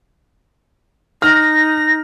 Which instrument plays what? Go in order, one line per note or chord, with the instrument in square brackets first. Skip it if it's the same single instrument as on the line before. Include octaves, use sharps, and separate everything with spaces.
[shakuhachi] D#4 [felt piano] F6 [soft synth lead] A#6